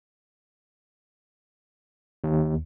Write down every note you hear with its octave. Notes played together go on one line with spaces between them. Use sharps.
D#2